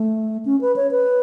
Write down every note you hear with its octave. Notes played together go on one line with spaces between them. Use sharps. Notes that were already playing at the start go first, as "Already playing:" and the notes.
Already playing: A3
C#4
B4
C#5
B4